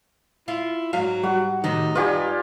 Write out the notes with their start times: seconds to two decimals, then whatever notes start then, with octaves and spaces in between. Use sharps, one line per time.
0.48 E4 F4
0.93 G#2 F#3 F5
1.23 G3 F#4
1.64 A2 C3 D#3 D#4
1.95 F#2 G3 F4 G4 B4 G#5